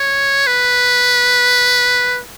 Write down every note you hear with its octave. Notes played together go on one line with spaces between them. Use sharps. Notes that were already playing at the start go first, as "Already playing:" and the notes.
Already playing: C#5
B4